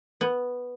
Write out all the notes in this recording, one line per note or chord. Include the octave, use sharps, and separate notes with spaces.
B3